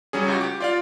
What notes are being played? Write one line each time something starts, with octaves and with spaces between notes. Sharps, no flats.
F#3 G3 C#4 G#4
C#2 F#4 G4
G4 D6
F4 D5 F5